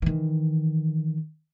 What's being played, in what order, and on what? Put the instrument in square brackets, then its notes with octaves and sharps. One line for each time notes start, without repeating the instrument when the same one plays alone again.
[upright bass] D#3 E3